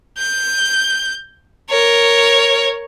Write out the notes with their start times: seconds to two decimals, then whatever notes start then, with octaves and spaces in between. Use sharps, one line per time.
0.18 G6
1.70 A#4 C#5